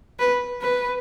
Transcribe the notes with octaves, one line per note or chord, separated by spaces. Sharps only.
B4
B4